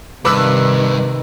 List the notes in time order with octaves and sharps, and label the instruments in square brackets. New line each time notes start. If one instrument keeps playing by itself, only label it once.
[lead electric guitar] G2 [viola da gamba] C3 D#3 [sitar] B4 [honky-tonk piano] D6 E6